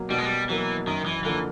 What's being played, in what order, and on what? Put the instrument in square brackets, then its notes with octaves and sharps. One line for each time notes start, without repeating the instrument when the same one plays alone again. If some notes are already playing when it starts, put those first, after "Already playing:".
Already playing: [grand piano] B2 F#3 A#3
[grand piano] B2 [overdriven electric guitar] G3
[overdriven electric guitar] G#3
G3
[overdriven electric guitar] E3 [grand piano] F#3 A#3
[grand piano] F#2 [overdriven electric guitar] D#3
[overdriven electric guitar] E3
[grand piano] D3 F3 A#3 [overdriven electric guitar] E3